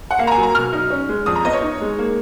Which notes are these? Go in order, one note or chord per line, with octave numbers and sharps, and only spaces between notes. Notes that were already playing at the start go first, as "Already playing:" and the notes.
F#5
A#3 F5
A#5
G#5
F#3
A#5
B2 F6
D#4
C#4
G#3
F2 D#6
A#5
B3 D#5
C#5
D#4
G#3
A#3